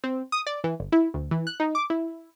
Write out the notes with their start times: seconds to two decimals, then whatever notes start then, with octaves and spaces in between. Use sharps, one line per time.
0.04 C4
0.32 D#6
0.47 D5
0.64 E3
0.80 G1
0.92 E4
1.14 D2
1.31 E3
1.47 F#6
1.60 D#4
1.75 D6
1.90 E4